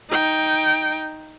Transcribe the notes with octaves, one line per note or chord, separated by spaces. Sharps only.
D#4 G5